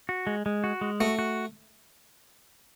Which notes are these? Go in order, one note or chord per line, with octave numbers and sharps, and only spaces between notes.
F#4
G#3
G#3
F#4
G#3
A3 F#4
F#4